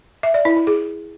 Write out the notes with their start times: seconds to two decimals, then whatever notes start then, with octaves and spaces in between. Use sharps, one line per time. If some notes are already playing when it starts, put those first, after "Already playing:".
0.23 E5
0.34 D5
0.45 E4
0.56 E4
0.67 G#4